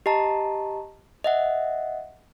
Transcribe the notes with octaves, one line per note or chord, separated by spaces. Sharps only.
G4 D#5 A5 A#5
D#5 E5 F#5